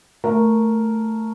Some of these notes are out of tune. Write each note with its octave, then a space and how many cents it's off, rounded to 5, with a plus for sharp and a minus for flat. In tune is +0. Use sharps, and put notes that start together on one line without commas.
A3 +5 A#4 +0